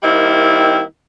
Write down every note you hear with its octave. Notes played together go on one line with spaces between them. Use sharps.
D#3 G3 A#3 C4 D#4 E4